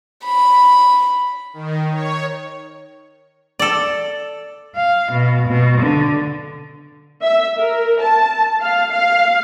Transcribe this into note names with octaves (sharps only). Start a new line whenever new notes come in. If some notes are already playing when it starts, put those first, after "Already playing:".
B5
D#3
C#5
A4 D5
F5
B2
B2
D3
E5
A#4
A5
F5
F5